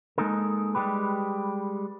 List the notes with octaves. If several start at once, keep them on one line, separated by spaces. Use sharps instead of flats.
G#3 A#3 D#4 A4 A#4
G3 G#3 G4 B4